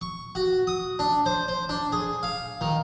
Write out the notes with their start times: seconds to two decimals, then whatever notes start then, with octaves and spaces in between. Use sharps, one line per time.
0.01 C#6
0.35 F#4
0.67 D#6
0.99 D4
1.26 C5
1.48 C5
1.69 D4
1.92 G#4
2.23 F5
2.61 D#3